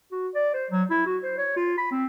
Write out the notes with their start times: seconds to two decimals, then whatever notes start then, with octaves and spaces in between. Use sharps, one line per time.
0.11 F#4
0.35 D5
0.54 C5
0.71 F#3
0.90 E4
1.06 F#4
1.23 C5
1.38 C#5
1.56 F4
1.78 B5
1.91 C4